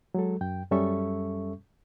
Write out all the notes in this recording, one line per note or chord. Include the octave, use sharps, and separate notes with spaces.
F#3 G#3 A4
F#2 G5
F#2 G3 C#4 A4 E5 C#6